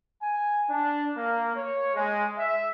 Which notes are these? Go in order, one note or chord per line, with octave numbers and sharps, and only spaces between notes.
G#5
D4
A#3
C#5
G#3
E5